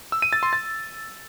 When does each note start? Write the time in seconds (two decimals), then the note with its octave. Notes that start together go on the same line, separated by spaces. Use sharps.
0.12 E6
0.22 D#7
0.33 A6
0.43 C6
0.53 A6